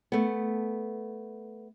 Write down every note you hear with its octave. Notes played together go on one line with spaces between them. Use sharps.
A3 B3